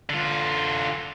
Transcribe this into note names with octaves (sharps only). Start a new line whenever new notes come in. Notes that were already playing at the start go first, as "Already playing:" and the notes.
D3 F4